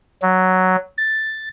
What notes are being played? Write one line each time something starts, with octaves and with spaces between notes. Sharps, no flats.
F#3
A6